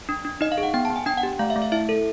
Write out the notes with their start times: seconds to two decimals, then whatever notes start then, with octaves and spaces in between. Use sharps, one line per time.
0.09 D4
0.25 D4
0.41 D#4 D#5
0.52 F5
0.58 G#4
0.63 F#5
0.74 B3 G5
0.85 A5
0.90 B3
0.96 G#5
1.06 D4 G5
1.17 F#5
1.23 G4
1.39 A3 F5
1.50 E5
1.56 A3
1.62 E5
1.72 E4 E5
1.89 A4